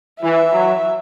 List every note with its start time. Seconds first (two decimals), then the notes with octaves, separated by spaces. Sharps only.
0.22 E3 E5
0.52 F#3